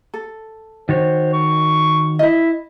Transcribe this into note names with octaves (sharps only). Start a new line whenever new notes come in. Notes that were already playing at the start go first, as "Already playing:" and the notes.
A4
D#3 F#4 C5 C#5
C#6
E4 D#5 E5